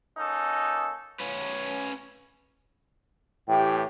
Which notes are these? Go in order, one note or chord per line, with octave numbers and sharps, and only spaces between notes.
A#3 C#4 D#4 A4
C#4 B4
A2 E3 G4 G5